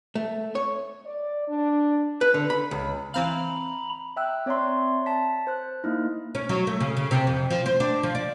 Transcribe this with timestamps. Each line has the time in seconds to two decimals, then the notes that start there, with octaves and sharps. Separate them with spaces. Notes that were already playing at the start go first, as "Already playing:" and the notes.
0.15 A3
0.55 C#5
1.06 D5
1.48 D4
2.21 B4
2.34 D3
2.50 B5
2.71 C#2
3.14 E3 C4 F5 A#5 B5
4.16 E5 G5 E6 F#6
4.46 C4 C#5 D5 E5 A#5 C6
5.06 A5 B6
5.47 C5 F#6
5.84 A#3 D#4 E4
6.35 C#4
6.49 F#3
6.67 A3
6.80 C#3
6.97 C#3
7.11 C3
7.27 F2
7.50 F3
7.66 C5
7.80 D4
8.03 F3
8.15 D5